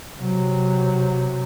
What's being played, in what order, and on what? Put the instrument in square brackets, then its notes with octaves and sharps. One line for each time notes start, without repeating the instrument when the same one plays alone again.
[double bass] C3 F#3